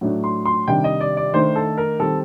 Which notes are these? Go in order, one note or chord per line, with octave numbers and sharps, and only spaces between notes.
A2 F#3 A3 D4
C6
C6
C3 D#3 G3 D4 G5
D#5
D5
D5
D#3 A3 D4 C5
A4
A#4
D#3 G3 C4 A4